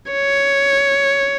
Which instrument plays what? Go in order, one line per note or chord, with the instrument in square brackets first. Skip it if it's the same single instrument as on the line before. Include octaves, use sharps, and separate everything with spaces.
[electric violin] C#5